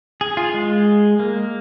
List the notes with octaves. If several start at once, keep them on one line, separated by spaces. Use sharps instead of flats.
G#4
F4
G#3
A#3